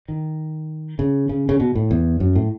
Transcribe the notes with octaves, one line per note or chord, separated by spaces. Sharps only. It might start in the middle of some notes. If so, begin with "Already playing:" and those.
D#3
C#3
C#3
C#3
B2
A2
E2
F#2
A2